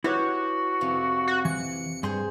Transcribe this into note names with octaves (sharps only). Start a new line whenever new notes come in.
E4 F#4 G4 B4 C#5
F2 C3
F#4
E3 C#7
G2 G#4 C5 C6